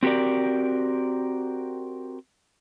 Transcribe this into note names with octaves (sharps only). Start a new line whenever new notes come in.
C4 F#4 G4 A#4 D5